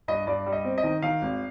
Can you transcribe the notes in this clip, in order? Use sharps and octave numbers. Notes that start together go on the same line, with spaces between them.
G2 D#5
G2 D5
G3
D#5
C4
D#5
D#3
D#3 F5
G#1